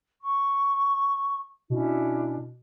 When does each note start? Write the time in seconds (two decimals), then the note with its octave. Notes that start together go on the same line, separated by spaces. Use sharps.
0.20 C#6
1.70 B2 C#4 D4 E4